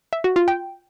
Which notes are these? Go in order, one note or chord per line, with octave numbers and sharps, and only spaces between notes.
E5
F#4
F4
G5